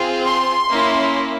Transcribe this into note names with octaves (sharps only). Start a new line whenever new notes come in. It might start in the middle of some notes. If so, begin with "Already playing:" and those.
Already playing: C4 F4 G#4
C6
A#3 C#4 E4